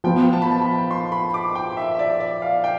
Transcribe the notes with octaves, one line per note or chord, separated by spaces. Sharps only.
F3 B3 F4 G5
A5
B5
A5
B5
C6
B5
D6
G5
E5
E5
D5
D5
F5
G5